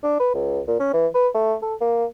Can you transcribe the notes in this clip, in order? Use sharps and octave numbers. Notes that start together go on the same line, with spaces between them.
D4
B4
C#2
A#2
C#4
E3
B4
A3
A4
A#3